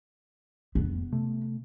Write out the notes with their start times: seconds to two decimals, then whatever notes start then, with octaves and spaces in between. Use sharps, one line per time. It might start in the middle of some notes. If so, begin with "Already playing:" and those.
0.75 F1 B3
1.12 C3 A3